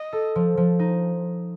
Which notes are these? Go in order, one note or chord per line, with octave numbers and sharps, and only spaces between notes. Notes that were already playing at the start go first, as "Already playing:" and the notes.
Already playing: D#5
A4
F3
F3
D#4